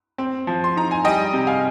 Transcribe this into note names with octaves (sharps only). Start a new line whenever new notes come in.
C4
F3
C6
D#4 A#5
G#5
G3 D#5 G5
C3
F5 G#5